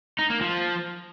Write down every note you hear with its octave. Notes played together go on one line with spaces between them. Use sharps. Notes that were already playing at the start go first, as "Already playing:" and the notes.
D#4
A#3
F3